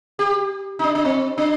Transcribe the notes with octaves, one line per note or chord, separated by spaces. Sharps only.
G4
D#4
D4
D4
C4
D4